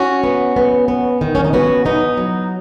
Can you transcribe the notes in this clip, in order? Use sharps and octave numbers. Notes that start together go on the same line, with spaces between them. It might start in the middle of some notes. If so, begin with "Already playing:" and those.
Already playing: C#4 F#4
B3
B3
B3
D#3
C#4
D#4
B3 C#4 F#4
B3 D#4
F#3